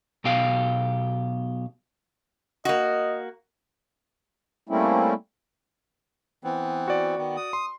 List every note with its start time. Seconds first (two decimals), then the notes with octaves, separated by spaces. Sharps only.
0.24 B1 B2 G4 F5
2.65 A#3 F#4 D#5
4.69 G3 A3 A#3 C4 C#4 E4
6.44 E3 B3 C4
6.88 F#4 D5
7.18 D#3 B3
7.37 D#6
7.53 C6